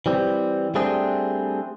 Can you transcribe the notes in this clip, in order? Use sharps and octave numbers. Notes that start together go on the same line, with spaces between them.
E3 G3 C4
G3 A3 C4 D4 G#4